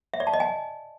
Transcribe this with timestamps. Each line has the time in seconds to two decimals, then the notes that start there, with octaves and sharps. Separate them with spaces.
0.14 E5
0.20 D5
0.27 A5
0.34 D#5
0.40 G#5